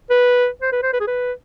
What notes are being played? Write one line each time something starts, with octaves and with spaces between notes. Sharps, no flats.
B4
C5
B4
C5
B4
G#4
B4